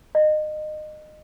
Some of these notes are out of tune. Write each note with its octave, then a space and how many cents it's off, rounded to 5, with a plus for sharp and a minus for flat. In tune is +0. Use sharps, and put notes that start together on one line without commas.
D#5 -25